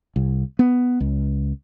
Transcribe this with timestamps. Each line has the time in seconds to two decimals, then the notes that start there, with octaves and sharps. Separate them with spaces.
0.16 C2
0.59 B3
1.00 C#2